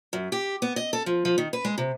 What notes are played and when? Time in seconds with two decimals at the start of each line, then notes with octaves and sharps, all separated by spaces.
0.13 F#2
0.32 G4
0.62 B3
0.76 D#5
0.93 A4
1.06 F3
1.25 F3
1.38 D#3
1.53 B4
1.65 G#3
1.78 C3